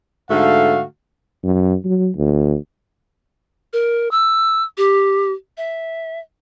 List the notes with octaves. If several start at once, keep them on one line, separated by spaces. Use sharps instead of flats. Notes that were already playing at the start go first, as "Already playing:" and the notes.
G#2 D3 A3 F#4 F5
F#2
F#3
D2
A#4
E6
G4
E5